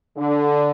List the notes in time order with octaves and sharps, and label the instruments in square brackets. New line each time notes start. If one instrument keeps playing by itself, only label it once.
[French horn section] D3